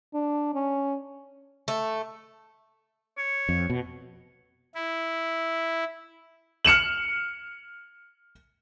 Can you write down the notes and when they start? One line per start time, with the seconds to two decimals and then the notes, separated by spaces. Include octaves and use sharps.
0.14 D4
0.54 C#4
1.68 A3
3.18 C#5
3.49 F2
3.70 B2
4.75 E4
6.65 F6 C#7 E7 F#7